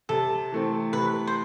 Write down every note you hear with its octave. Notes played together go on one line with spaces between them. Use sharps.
C3 A4
E3 A3 C4
C3 B4
C5